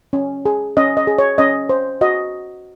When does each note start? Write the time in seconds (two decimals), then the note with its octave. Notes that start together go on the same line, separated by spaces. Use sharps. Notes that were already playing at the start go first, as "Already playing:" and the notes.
0.13 C#4
0.45 G#4
0.77 C#4 D#5
0.97 D#5
1.07 G#4
1.19 C#5
1.38 C#4 D#5
1.69 C5
2.01 F#4 D#5